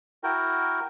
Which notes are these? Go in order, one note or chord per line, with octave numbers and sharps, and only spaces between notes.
E4 F#4 A#4 G5